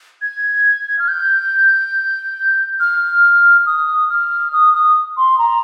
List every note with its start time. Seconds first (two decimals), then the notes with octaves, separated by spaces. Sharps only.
0.22 G#6
0.99 F6
1.08 G6
2.80 F6
3.66 D#6
4.09 F6
4.53 D#6
4.73 D#6
5.17 C6
5.38 A#5